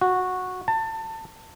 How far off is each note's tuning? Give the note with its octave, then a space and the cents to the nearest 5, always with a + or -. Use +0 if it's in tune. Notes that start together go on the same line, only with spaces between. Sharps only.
F#4 -10
A5 +25